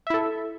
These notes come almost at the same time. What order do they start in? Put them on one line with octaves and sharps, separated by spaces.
E5 E4 A4